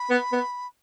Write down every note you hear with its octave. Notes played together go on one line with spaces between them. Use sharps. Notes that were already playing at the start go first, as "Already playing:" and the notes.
Already playing: B5
B3
B3